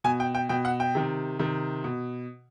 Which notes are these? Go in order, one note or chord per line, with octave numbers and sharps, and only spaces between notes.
B2 G#5
G5
G5
B2 G5
F#5
G5
C3 D#3
C3 D#3
B2